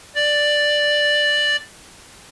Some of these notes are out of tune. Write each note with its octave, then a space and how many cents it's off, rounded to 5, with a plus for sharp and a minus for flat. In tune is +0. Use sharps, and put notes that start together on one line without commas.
D5 +5